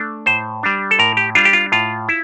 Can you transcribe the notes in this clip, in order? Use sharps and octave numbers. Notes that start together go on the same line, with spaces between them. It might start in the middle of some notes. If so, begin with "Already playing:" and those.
Already playing: A3 D4
A2 C5
G3 D4
A4
A2 A#4
G4
G3 D4 F4
G4
F4
A2 F4
E4